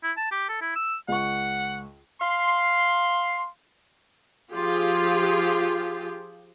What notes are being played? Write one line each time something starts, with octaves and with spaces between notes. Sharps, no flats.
E4
A5
G4
A4
E4
E6
C#2 F#5 C#6
F5 C6
F3 F4 G4 G#4